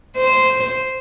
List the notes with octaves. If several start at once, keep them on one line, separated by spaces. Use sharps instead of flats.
C5